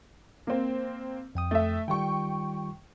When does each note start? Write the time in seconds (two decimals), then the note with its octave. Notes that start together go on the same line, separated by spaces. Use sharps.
0.47 A#3 C4
1.35 F2 G5 D#6
1.51 A3 E5
1.88 D#3 G3 F4 G5 C#6